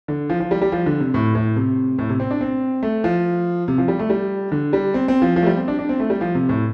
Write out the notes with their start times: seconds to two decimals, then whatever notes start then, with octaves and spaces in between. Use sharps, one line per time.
0.08 D3
0.30 F3
0.40 F3
0.51 G3
0.61 G3
0.72 F3
0.86 D3
1.00 C3
1.14 A2
1.35 A2
1.56 C3
1.99 A2
2.09 C3
2.20 C4
2.31 D4
2.41 C4
2.83 A3
3.04 F3
3.68 C3
3.78 F3
3.88 G3
3.99 A3
4.10 G3
4.52 D3
4.73 G3
4.94 C4
5.08 C4
5.22 F3
5.36 F3
5.42 A3
5.47 G3
5.57 C4
5.68 D4
5.79 D4
5.89 C4
6.00 A3
6.10 G3
6.21 F3
6.35 C3
6.49 A2